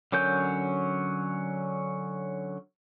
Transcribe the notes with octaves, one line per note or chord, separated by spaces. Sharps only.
D3 F#3 C#4 A#4 G6